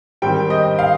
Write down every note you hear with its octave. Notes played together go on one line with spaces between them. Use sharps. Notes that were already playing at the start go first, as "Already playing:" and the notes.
G#2 D#3 G3 C4 G5
D#5
F5